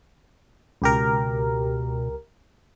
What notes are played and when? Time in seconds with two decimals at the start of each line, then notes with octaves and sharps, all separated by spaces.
0.82 C#2 B2 G4 A#4